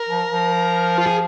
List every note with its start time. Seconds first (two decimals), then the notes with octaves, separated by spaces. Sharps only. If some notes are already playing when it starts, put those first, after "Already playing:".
Already playing: A#4
0.09 F3
0.30 F3
0.98 F4
1.06 G#4